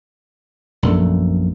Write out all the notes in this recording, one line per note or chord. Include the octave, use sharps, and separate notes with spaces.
A#1 F#2 A3